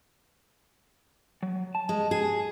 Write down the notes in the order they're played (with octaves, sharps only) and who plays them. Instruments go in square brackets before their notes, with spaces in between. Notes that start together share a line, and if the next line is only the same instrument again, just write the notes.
[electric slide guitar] F#3
A5
[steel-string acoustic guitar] G#3
G#4